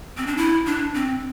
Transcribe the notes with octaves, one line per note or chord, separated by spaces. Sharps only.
C4
D4
E4
D4
C4